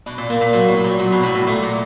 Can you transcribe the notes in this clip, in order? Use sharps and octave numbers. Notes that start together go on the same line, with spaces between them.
B2 D4
A#2
A#2 A#3
A#2
A#2 F#3
A2
F#3
A#2
A#2 F#3
B2
A2 F#3
A2
A#2 A3
A#2